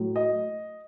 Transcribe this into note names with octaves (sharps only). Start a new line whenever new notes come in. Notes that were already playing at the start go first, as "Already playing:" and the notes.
Already playing: A2 F#3
D#5